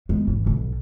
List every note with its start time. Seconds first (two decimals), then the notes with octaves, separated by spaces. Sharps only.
0.09 G#3 B3
0.27 G#1 E3
0.46 B1